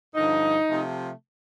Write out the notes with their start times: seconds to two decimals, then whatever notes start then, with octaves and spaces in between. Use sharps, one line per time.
0.14 G2 D3 F3 D#4
0.68 C3 F3 A3